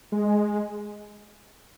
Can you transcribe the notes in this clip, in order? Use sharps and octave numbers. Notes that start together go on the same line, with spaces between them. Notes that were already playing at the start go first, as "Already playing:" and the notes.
G#3